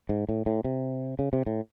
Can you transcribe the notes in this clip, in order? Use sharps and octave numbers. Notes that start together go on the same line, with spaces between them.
G#2
A2
A2
C3
C#3
C3
A2